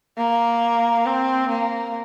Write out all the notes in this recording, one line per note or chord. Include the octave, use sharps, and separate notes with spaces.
A#3
C4
A#3